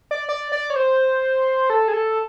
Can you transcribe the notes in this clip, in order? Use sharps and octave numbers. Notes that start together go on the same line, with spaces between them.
D5
D5
D5
C#5
C5
A4
G#4
A4